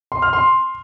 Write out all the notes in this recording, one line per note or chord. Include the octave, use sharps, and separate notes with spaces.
C6
F6
C6